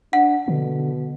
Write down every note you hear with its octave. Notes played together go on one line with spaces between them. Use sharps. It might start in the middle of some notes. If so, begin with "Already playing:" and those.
D4 F#5
B2 D3